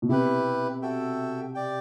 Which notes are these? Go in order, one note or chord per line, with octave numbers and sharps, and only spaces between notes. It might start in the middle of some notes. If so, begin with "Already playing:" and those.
B2
C3 E4 G4 B4
F#4 A4 E5 G5
G4 D5 G5